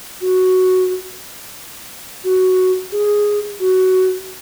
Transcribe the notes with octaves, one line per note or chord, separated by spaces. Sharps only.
F#4
F#4
G#4
F#4